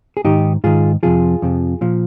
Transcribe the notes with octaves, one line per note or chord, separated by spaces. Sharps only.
G#4
G#2 D#3 D#4 G4
G#2 D#3 F4 G#4
F2 C3 F3 F4 G#4
F2 C3 F3
A#2 F3